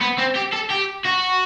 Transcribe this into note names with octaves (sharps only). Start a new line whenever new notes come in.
B3
C4
G4
A4
G4
F#4